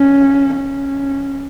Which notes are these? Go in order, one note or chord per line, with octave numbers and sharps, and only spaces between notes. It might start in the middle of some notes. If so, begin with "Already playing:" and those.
Already playing: C#4
C#4